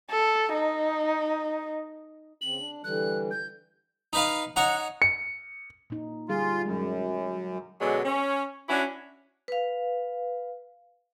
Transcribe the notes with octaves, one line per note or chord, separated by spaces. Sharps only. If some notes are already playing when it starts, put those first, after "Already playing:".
A4
D#4
C#3 C4 F#7
D4
D3 E3 G3 F#6
G6
D#4 B4 F5
D#4 C#5 F#5 A#5
C#7
A#2 D#4
D3 G3 F4 G#4
F#2 F#3 G#3
B2 D3 F#3 G#3 C#4
C#4
C#4 D4 E4 F#4
B4 F5